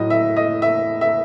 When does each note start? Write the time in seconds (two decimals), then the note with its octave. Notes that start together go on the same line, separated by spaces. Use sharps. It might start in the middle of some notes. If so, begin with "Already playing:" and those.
Already playing: A2 F#3 D#5
0.10 E5
0.36 D#5
0.62 E5
1.01 E5